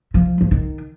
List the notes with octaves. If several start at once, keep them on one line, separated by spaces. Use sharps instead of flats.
F3
F3
D#3